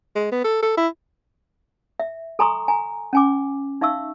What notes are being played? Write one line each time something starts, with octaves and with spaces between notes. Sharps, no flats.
G#3
B3
A4
A4
E4
E5
A4 G#5 A#5 C6 C#6 D#6
G#5 A#5
C#4 G#5 D6
D#4 E5 F5 C#6 E6